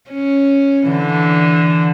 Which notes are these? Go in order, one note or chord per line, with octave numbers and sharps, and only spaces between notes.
C#4
D3 E3